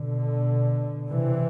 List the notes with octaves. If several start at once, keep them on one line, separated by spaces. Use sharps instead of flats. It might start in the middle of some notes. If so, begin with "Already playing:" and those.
Already playing: B2 D3
C3 E3